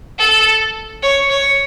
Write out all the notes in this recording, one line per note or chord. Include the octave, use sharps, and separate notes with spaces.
A4
C#5
C#5